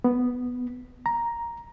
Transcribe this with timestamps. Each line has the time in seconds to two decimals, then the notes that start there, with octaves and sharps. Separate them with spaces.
0.04 B3
1.06 A#5